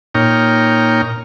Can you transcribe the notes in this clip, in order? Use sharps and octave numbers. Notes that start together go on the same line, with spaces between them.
A#2 D#4 C#5 G5 A#5 F6